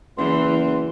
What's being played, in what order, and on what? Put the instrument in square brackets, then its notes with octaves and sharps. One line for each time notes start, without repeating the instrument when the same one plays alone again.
[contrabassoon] F#1 [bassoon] E2 [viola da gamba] E3 [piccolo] C6